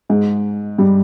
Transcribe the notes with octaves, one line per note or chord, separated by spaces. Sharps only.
G#2 G#3
G2 G3